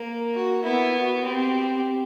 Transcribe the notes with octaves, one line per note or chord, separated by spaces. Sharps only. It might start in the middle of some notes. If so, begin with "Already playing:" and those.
Already playing: A#3
F#4
B3 E4
F#4
C4 G4